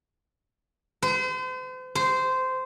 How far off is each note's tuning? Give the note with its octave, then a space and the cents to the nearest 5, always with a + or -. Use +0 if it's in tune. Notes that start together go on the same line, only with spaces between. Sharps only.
C5 -40
C5 -15